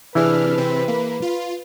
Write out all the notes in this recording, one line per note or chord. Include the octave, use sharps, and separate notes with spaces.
C3 E3 D4 E4 G#4 B4 F6
C3 C4
A#3
F4